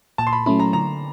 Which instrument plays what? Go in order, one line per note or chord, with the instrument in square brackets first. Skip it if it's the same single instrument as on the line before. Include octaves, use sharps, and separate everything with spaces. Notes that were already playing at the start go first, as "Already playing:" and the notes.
[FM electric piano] A#2 [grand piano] A5
[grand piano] C6
B5
[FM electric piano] F#3 A3 C#4 E4 [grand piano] B5
[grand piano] A#5
[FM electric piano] D3 [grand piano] A#5